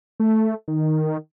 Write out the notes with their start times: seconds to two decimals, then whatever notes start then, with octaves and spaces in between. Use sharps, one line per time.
0.20 A3
0.68 D#3